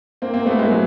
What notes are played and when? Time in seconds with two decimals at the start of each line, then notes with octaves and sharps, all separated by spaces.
0.22 A#3 C4
0.34 A#3 C4
0.46 A3 B3
0.59 G#3 A#3
0.70 F#3 G#3